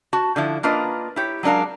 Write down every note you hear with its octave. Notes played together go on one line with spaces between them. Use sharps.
F#4 A5
D3 F3 E4
A#3 D4 F4 A#4 B4 D#5
E4 G4 C#5
F#3 G#3 D4 A#4 F5